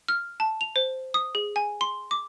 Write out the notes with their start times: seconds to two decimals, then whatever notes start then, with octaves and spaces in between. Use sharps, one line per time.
0.08 F6
0.40 A5
0.61 F7
0.76 C5
1.14 D#6
1.35 G#4
1.56 G#5
1.81 C6
2.11 D6